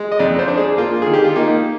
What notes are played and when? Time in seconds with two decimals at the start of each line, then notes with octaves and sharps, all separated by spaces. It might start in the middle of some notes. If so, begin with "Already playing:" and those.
Already playing: G#3
0.12 D#5
0.19 F2 D5
0.39 C5
0.48 D4
0.58 G#4
0.77 A#3 F4
1.02 D#3 G#4
1.13 G4
1.24 F4
1.35 A#3 D#4